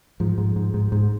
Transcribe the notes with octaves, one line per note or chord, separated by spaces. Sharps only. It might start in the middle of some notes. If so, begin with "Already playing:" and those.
G#2 F3
G#2
G#2
G#2
G#2